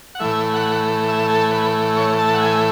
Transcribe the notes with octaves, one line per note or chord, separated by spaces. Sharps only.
F#5
A2 E3 A3 E5
F#5
E5
A4
B4
C#5
A5
F#5
G#5